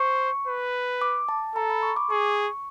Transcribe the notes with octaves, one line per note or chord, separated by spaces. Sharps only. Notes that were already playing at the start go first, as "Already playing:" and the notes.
Already playing: C5 C#6
B4
D6
A5
A4 A#5
B5
C#6
D6
G#4 C#6